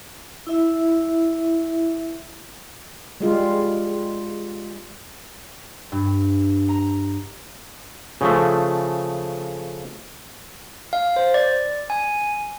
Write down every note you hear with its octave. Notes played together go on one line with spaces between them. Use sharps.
E4 E5
G3 G#3 F4
G2
A#5
C#3 F3 A3
F5
C5
D5
G#5